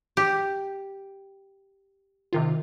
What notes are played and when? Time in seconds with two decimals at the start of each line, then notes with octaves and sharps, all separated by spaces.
0.17 G4
2.33 C3 D#3 F4